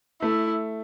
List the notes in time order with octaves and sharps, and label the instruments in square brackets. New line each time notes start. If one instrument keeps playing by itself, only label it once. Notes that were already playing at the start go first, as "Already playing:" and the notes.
[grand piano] A3 [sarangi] E4